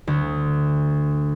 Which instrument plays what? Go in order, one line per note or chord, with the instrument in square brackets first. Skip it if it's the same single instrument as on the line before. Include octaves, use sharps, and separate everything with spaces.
[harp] D2